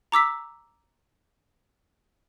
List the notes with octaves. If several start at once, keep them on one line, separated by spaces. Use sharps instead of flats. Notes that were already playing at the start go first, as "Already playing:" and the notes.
A#5 D6 E6 B6